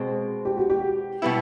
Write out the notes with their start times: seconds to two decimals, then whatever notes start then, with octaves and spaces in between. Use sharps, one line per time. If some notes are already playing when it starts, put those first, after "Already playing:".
Already playing: B2 G#3 C4
0.45 G4
0.57 F#4
0.70 G4
1.22 B2 G3 B3 E4